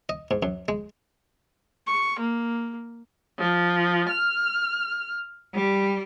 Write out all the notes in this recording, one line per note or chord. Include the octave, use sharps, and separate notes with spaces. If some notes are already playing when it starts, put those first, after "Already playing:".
D#5
G#2
F#2
G#3
C#6
A#3
F3
F6
G3